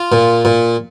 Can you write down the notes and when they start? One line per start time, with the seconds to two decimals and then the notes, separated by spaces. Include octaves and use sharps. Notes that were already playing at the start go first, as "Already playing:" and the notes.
Already playing: F4
0.12 A#2
0.45 A#2